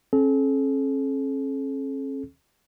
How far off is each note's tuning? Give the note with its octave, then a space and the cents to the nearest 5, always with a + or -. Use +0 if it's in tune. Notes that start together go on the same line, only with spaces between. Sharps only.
C#4 -45 A4 -40